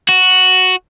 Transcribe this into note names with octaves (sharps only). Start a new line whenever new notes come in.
F#4